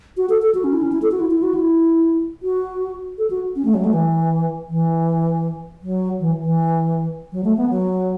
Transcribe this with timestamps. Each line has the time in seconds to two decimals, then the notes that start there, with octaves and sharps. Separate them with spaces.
0.17 F#4
0.29 A4
0.42 A4
0.55 F#4
0.64 C#4
0.73 E4
0.83 C#4
0.92 E4
1.02 A4
1.12 F#4
1.20 E4
1.30 E4
1.43 F#4
1.54 E4
2.43 F#4
3.18 A4
3.30 F#4
3.56 C#4
3.65 A3
3.74 F#3
3.84 A3
3.93 E3
4.69 E3
5.82 F#3
6.20 E3
6.41 E3
7.32 F#3
7.44 A3
7.57 B3
7.70 F#3